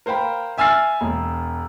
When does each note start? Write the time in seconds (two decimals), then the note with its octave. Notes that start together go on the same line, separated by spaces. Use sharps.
0.06 A#4 C5 F5 G5 B5
0.58 E5 G#5 E6 F6 A6 C7
1.01 E1